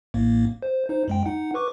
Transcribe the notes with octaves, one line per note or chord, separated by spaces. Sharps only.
A1 A2 A#3
C5
D#4 C5
F#2 G#3 G5
D#4 F#5
B4 C#6 D6